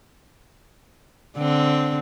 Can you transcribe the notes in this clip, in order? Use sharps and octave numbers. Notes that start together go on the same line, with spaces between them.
D3 C4